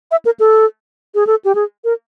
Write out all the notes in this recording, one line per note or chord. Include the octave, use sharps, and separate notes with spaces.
E5
A#4
A4
G#4
A4
G4
G#4
A#4